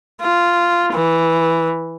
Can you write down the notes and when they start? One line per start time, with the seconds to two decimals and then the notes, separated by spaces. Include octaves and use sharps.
0.22 F4
0.93 E3